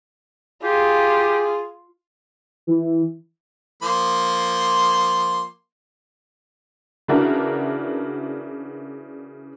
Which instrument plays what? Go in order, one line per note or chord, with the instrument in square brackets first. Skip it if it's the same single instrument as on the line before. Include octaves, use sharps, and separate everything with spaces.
[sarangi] F4 [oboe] G4 [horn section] G#4
[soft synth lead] E3
[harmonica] F3 A#3 C6
[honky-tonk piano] C#3 E3 D4 F#4 A#4